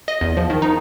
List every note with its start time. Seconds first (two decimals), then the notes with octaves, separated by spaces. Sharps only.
0.08 D#5
0.21 E2
0.37 F3
0.50 D#3
0.62 D#4